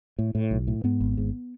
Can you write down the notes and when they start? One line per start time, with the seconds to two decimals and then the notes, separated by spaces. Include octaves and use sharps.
0.19 A2
0.35 A2
0.51 B1
0.68 A2
0.84 G#2 B3
1.00 G#1
1.17 G#2